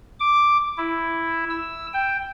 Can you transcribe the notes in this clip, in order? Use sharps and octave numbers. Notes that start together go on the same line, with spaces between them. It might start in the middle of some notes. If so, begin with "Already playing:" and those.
D6
E4
E6
G5